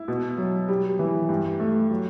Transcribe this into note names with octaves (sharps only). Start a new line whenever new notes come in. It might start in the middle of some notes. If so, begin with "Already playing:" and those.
Already playing: E4
B2
F#3
G3
E3
G2
A3
F#3